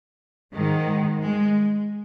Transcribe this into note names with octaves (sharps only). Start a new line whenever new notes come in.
G#2 D#3 G#3
G#3